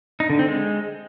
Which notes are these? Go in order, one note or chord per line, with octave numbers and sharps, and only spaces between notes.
D#4
D3
C4
G#3